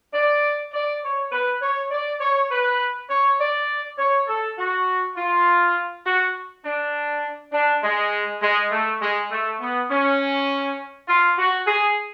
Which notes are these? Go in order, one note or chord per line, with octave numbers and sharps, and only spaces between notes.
D5
D5
C#5
B4
C#5
D5
C#5
B4
C#5
D5
C#5
A4
F#4
F4
F#4
D4
D4
G#3
G#3
A3
G#3
A3
B3
C#4
F4
F#4
G#4